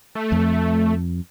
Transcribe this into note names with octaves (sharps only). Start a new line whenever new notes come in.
A3
F2